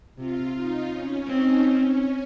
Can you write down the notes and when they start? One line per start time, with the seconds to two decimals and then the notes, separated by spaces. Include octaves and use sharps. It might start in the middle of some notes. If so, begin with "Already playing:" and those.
0.18 C3 F4
0.55 D#4
0.91 C#4
1.27 C4 D#4
1.63 C#4